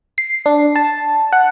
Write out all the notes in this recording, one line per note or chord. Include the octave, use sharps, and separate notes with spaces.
C7
D4
A5
F#5